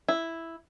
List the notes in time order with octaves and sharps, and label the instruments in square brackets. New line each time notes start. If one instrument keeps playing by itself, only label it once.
[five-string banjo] E4